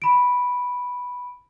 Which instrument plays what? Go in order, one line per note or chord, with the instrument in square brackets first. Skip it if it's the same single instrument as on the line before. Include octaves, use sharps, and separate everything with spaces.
[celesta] B5 D7